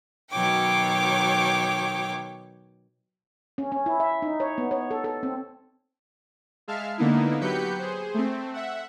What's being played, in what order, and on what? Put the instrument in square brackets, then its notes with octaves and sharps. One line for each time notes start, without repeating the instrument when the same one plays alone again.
[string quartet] B2 D#3 F#3 C#5 G5 D6
[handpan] C#4
C#4
E4
E5
D#4
C#5
B3
C#5
A4
A4
C4
[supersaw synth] G#3 E5 F5 A5 F6
D3 A#3 B3 D#4 E4
F#3 G4 B4 G6 B6 C#7
G#4 C5
A3 C4
E5 F#5